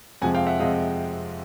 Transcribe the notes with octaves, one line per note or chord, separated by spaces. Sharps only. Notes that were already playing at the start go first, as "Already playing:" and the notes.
F2 C3 F3 G#3 F#5 G#5
F5 G5
E5 F#5
C3 F3 G#3 D#5 F5